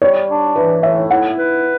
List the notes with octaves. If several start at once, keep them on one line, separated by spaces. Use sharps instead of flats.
G3 C#5
D4
E3 B4
A2 E5
E4 F#5
B4